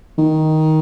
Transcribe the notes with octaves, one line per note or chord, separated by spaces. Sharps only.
D#3